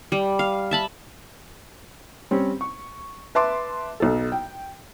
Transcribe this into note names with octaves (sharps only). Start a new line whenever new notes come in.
G3
F5
E5 A5 B5
G3 C4 C#4
C#6
B4 E5 A5 C6 D6
B1 A4
G5